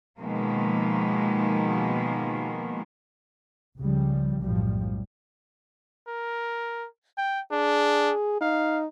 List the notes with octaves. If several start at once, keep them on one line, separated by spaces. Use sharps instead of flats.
B2 D#3 F3 G#3 A#3
C#2 C#3 F3 G3
B1 F#2 A2 F3 G3
A#4
G5
D4 G#4
D#4 F5